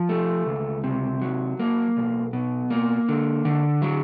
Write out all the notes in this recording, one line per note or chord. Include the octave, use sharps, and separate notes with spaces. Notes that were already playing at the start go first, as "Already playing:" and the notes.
Already playing: F3
A3
C#2
C3
F#3
A#3
B1
B2
A#3
D3
D3
F#3